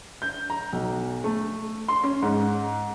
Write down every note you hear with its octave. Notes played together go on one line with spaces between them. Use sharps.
G6
A#5
B1
A3
C6
C#4
G#2